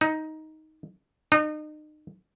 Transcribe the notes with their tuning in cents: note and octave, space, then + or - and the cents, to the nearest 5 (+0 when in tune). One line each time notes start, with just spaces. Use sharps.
D#4 +10
D#4 -35